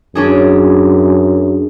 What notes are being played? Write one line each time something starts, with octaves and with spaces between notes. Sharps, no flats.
F#2 C#4 D4 G#4